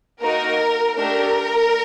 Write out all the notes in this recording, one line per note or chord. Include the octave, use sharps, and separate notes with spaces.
A#3 D#4 F#4 A#4
A3 D4 G4 A#4